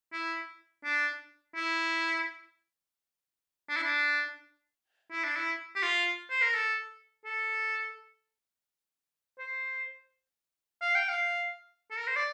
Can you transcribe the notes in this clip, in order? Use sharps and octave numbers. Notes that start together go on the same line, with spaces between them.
E4
D4
E4
D4
E4
D4
E4
D4
E4
G4
F4
C5
A#4
A4
A4
C5
F5
G5
F5
A4
A#4
C5
D5